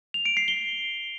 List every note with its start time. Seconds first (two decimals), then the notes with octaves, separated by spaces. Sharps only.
0.14 F7
0.26 D7
0.37 C7
0.48 G7